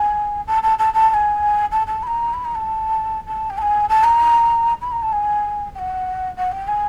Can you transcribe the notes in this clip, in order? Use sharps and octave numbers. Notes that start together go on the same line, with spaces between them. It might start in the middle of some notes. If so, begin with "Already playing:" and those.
Already playing: G#5
A5
A5
A5
A5
A5
G#5
A5
A5
B5
A#5
B5
A#5
A5
A5
G5
A5
G#5
A5
A#5
B5
A#5
A5
G#5
G5
F#5
F#5
G5
G#5